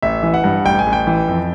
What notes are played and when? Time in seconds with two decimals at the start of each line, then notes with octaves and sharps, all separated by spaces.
0.02 A1 E5
0.23 E3
0.34 F#5
0.44 G2
0.65 A1 G5
0.79 G#5
0.86 A1
0.93 G5
1.07 E3
1.28 F2